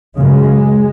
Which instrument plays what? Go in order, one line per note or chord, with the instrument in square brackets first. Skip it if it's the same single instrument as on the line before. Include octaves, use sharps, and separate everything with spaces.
[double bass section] F#2 C#3 G#3